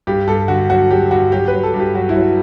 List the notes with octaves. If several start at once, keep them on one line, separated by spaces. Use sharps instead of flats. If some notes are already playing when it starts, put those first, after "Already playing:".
G2 G4
G2 A4
D3 F#4
F#3 F#4
F#3 G4
G2 F#4
F#3 G4
B4
F#3
A4
G2
G4
F#3 F#4
E4
F#3
F#4